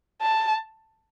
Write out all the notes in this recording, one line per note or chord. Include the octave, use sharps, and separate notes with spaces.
A5